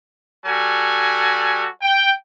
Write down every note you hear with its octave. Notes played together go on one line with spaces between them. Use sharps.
G3 F#4 A4 G#5
G5